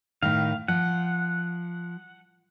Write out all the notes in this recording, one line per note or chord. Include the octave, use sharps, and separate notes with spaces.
A2 D#3 F5
F3 F#5